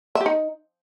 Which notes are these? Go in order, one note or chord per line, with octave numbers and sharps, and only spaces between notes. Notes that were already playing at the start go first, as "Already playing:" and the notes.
E5
G4
D#4